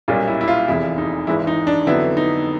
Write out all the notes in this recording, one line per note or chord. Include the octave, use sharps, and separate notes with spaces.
B1 A#2 G3 A#3 C#4 F4
E4
E4
F4
F1 E2 C3 E4
D#4
G#1 G#2 E3 G#3 E4
D#4
D4
F2 D3 F#3 B3 E4
D#4